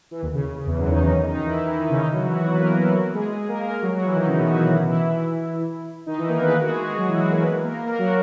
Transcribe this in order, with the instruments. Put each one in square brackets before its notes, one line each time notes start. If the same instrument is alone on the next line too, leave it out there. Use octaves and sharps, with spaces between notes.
[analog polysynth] E3
D#2 D#3
C#3
C#3
C#3
E2 E3
F#2 F#3
D#3 D#4
C#3 C#4
D#4
C#3 C#4
D#3 D#4
D#3 D#4
E3 E4
E3 E4
E3 E4
D#3 D#4
C#3 C#4
D#3 D#4
F#3 F#4
E3 E4
F#3 F#4
B3 B4
A#3 A#4
E3 E4
E3 E4
F#3 F#4
G#3 G#4
G#3 G#4
A#3 A#4
A#3 A#4
A#3 A#4
F#3 F#4
F#3 F#4
E3 E4
D#3 D#4
C#3 C#4
B2 B3
F#3 F#4
E3 E4
E3 E4
E3 E4
D#3 D#4
E3 E4
A#3 A#4
B3 B4
G#4
A#3 A#4
F#4
G#3 G#4
G#3 G#4
F#3 F#4
E3 E4
F#3 F#4
A#3 A#4
B3 B4
A#3 A#4
A#3 A#4
F#3 F#4